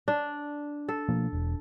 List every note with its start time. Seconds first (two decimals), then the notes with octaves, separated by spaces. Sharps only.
0.08 D4
0.89 A4
1.09 B2 F3 A#3
1.33 E1